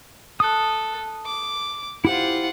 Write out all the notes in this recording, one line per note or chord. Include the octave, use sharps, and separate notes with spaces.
A4 D#6 F#6
D6
E4 F4 G4 C5 F#5